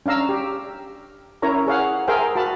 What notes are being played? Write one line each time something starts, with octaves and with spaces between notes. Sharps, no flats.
C#4 D4 F5 A#5 E6
G4
C#4 E4 A#4 C#5 A#5
G#4 C#5 F5 F#5
G#4 A#4 C5 E5 F5 G5
F#4 F5 A5 B5